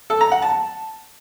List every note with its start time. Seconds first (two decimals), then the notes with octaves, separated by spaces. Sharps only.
0.10 A4
0.21 A#5
0.31 F#5
0.42 A5